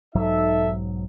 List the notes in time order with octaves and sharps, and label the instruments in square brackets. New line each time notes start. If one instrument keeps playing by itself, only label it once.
[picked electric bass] B1 G#2 F#3 [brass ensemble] D#4 A4 E5